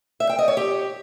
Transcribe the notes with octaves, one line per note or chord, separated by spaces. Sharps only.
E5
G5
D#5
C#5
G4